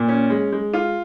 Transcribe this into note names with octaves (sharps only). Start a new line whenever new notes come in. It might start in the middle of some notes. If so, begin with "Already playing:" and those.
Already playing: A#2
C#4
G#3
G#3
F4